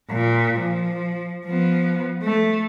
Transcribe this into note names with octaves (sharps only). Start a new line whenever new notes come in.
A#2
F3
F3 B3
A3